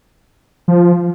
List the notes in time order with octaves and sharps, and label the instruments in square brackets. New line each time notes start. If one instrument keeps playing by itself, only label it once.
[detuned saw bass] F3